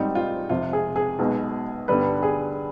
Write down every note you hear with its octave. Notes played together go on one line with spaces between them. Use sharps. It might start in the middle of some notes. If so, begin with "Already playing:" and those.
Already playing: G#1 G#2 G3 C4 D#4
F4
F2 C3 F3 F4
G#4
G#4
B1 B2 G#3
G2 D3 G3 B3 B4
G#4